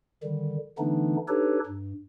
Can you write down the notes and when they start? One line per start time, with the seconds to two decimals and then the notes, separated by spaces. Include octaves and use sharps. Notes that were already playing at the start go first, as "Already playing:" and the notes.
0.24 D3 D#3 G3
0.79 D3 E3 A3 B3 D4 D#4
1.28 D4 D#4 G4 A4 B4 C#5
1.66 G2